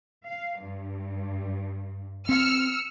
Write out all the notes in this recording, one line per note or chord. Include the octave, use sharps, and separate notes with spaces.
F5
G2
C4 E6 F6 C#7